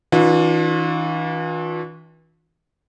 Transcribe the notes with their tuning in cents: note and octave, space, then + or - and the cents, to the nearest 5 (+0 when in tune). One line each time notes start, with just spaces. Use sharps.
E3 -35 D4 +0 F4 +40